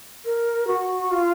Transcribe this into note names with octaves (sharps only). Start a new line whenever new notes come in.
A#4
F#4
F4